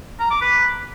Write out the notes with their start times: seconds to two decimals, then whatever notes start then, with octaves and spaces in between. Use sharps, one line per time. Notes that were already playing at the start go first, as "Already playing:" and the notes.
0.20 A#5
0.31 D6
0.41 B4